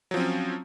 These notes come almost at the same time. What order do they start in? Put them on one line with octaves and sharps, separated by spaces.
F#3 F3 C4 C#4